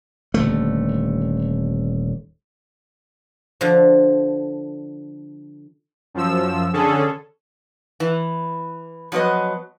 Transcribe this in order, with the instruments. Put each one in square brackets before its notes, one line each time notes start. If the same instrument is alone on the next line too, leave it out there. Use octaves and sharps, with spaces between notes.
[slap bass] D#1 D3 A3
[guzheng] D3 F3
[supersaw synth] F#2 F3 E6
D3 C#4 G#4 A4
[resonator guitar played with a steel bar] E3
F3 F#3 B3 B4 D#5